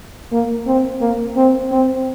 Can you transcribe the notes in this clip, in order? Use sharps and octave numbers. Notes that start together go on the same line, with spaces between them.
A#3
C4
A#3
C4
C4